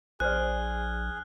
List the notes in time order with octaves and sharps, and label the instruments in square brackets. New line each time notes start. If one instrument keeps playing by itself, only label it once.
[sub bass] A#1 [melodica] G#4 [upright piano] C5 D5 [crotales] F6 F#6